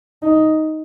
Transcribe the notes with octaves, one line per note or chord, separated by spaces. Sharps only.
D#4